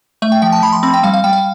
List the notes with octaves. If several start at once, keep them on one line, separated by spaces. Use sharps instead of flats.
A3 E5
G5
F3 G5
A5
F3 B5
C6
C4 B5
G5
G3 F5
F5
G3 G5
F5